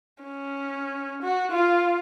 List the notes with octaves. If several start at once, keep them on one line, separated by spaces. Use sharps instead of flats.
C#4
F#4
F4